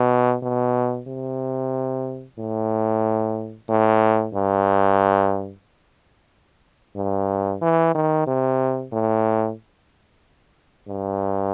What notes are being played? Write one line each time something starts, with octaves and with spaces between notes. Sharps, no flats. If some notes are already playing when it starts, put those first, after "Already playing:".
Already playing: B2
B2
C3
A2
A2
G2
G2
E3
D#3
C3
A2
G2